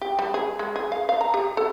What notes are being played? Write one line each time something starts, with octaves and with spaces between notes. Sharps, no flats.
G4
G3
G#4
G#3
G#4
F5
F5
A#5
G4
A4